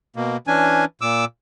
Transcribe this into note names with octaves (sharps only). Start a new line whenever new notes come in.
B2 A#3
E3 C#4 D4 G#5
A#2 D6 E6